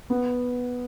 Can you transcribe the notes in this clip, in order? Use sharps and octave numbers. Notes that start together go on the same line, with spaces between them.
B3